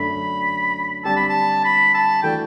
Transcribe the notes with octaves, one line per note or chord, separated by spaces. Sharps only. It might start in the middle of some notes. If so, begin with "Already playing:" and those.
Already playing: F#2 D3 A3 D4 B5
D3 G3 C4 G4 D5 A5
B5
A5
B5
A5
E3 A3 D4 F#4 A4 G5